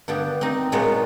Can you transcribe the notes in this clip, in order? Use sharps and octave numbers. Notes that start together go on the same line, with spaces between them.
G2 D3 B3 G4
C4 D#4
A#2 F#3 G#3 B3 D#4 F4